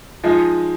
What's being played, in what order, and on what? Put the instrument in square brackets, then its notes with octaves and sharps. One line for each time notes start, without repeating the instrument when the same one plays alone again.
[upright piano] F3 G#3 D#4